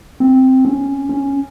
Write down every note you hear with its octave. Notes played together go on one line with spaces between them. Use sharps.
C4
C#4
C#4